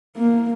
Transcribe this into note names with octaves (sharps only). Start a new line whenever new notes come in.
A#3